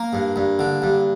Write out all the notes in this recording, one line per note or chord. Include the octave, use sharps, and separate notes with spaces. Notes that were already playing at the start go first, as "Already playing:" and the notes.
Already playing: A#3
G2
G2
D3
G2